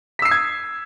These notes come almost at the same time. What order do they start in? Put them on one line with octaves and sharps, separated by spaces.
B6 E6 C7 D#6 G#6